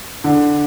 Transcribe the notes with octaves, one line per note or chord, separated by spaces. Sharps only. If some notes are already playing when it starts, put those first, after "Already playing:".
D3